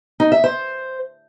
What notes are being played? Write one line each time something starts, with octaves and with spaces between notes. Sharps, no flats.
D#4
E5
C5